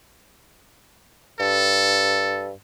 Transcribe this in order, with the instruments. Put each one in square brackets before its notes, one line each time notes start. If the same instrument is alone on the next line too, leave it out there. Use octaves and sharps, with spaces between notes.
[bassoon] G2 [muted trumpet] A4